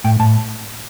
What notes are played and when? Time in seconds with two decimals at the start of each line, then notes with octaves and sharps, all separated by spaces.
0.04 A2 G5
0.20 A2 A5